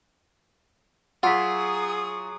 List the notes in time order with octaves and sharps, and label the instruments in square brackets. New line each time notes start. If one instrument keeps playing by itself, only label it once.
[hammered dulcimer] F#3 [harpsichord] F4 [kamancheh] G#4 D#6 [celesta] F#5 B6